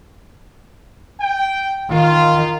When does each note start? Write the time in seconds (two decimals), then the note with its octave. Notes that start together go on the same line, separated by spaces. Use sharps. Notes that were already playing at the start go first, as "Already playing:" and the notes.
1.20 G5
1.90 D#3 F4